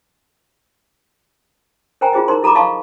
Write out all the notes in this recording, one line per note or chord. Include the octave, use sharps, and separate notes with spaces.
A#4 C5 G5 G#5 A#5
E4 F4 G#4 C5 D#5
D#4 A#4 C5 A#5 C6
E4 A4 A#5 B5 D6
D#5 F5 A5 C6 C#6